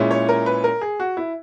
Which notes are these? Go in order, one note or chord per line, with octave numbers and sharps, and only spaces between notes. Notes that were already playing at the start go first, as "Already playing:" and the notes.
Already playing: A#2 G#3 C#4 E4
C#5
A#4
B4
A#4
G#4
F#4
E4